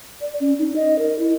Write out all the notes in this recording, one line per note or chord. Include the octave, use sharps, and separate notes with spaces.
D5
C#4
D#4
D#5
A#4
E4